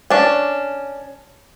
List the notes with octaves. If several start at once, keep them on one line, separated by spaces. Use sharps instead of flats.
C#4 D4